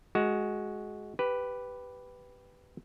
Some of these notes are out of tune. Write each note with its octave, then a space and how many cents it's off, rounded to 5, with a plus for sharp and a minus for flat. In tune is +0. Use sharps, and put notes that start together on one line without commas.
G#3 +15 F#4 +0
G4 -5 B4 +5